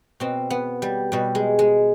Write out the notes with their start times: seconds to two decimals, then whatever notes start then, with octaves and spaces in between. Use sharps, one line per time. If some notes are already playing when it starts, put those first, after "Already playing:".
0.20 B2 C4
0.50 B3
0.82 G3
1.12 B2 G3
1.35 G#3
1.59 G#3